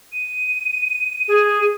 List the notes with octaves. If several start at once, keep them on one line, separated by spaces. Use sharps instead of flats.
D#7
G#4